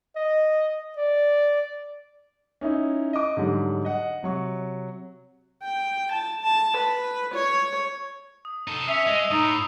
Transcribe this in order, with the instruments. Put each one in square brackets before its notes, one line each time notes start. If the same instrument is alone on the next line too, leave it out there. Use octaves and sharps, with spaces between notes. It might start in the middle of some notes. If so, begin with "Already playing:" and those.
[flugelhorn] D#5
D5
[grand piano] C#4 D#4 E4
D#5 D6
G#2 D3 F#3 G3
D#5 F#5
C3 F#3 C#6
[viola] G5
A5
A5
B4
C#5
[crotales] D#6
[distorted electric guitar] D#4 A4
[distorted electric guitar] C#4 [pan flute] E5 [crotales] E6 C7 F7
[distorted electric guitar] G#3 [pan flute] D#5
[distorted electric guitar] A2 [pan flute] D#4 [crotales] D#6